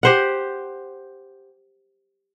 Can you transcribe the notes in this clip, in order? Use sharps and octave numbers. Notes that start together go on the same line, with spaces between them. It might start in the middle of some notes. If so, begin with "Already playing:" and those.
G4 C5 F#5